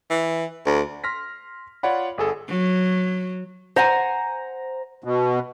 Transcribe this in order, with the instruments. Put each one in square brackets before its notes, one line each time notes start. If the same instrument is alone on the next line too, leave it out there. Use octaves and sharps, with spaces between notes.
[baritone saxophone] E3
D2
[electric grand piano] C6 F6 A#6 B6
F4 C#5 D5 F#5 B5
G1 G#4 A4 A5
[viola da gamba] F#3
[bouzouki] C5 F#5 G#5 [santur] A#5
[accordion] B2